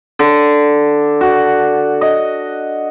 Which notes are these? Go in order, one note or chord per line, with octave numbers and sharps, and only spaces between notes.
D3
F#4
D#5